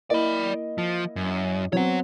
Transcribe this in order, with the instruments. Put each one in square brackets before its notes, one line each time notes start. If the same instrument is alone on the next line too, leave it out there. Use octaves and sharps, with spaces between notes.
[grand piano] A#3 E4 D#5 [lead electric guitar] D5 B5
[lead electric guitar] F3
F#2
[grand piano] F#3 B3 C4 [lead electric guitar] C#5 F#5